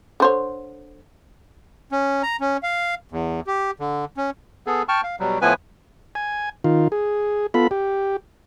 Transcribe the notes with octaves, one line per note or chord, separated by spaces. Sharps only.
D3 C5 C#5
C#4
A#5
C#4
F5
E2
G4
D3
C#4
B3 G#4 A4
G5 A5 C#6 F6
F5
B2 F#3 G3
A2 F3 B3 E4 B4 G#5
G#5
D#3 F4
G#4
B3 F4 A4 B5
G4